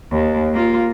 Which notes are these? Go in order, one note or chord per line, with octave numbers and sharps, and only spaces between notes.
D#2
A#3 F4